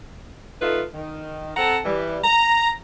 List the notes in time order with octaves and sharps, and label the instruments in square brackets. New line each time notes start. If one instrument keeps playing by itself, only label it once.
[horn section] A3 D#4 F4 A4 B4
D#3
C4 A4 F#5 A5 A#5
E3 G3
A#5